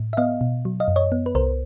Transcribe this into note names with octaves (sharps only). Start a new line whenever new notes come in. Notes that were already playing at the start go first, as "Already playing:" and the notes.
Already playing: A2
E5
B3 D#5 F5
B2
F#3
D#5 F5
F#2
C#5 D#5
B3
B4
C2 A#4 C5